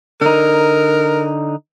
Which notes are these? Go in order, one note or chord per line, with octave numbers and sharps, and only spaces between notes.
D3 D#4 A#4